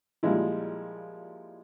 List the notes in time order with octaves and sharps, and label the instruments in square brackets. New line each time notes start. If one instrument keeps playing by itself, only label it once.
[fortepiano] A#2 F3 G3 G#3 E4